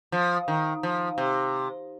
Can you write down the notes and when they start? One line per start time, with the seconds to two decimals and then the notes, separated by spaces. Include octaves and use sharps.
0.12 F3
0.48 D#3
0.83 F3
1.18 C3